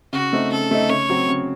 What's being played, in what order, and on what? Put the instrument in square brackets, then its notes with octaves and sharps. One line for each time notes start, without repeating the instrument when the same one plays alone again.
[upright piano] C#3 [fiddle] F#4
[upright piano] A3 C4 D#4
[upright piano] C#3 [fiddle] A4
[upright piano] A3 C4 D#4
[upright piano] C#3 [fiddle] C#5
[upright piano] F#3 C4
C#3